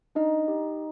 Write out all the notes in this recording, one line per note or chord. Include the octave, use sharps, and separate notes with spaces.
D4 D#4 D#5
G4